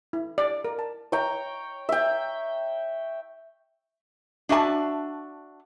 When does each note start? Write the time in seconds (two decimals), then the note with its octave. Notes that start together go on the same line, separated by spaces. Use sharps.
0.13 E4
0.38 D5
0.65 A#4
0.79 A5
1.12 C#5 G5 A#5
1.89 E5 G5
4.49 D4 F#4 E5 G#5 A5